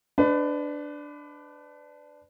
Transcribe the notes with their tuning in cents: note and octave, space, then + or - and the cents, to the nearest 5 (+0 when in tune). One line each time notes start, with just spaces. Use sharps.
D4 +0 B4 +30 D#5 +0